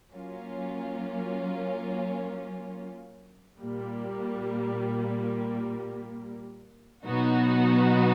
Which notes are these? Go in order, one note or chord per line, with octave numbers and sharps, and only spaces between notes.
F#3 A#3 C#4 F4
A#2 G3 A#3
B2 F#3 B3 D#4 F#4